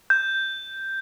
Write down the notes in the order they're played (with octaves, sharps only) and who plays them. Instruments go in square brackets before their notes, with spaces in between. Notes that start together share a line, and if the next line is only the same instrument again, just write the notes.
[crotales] G6